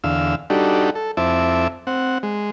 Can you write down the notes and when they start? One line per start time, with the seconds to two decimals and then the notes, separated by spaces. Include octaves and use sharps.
0.04 E2 D3 F5 E6
0.50 G3 D4 D#4 F#4 G4 A4
0.95 A4
1.17 F2 C4 E4 E5 A5 D6
1.87 C4 F#5
2.23 G#3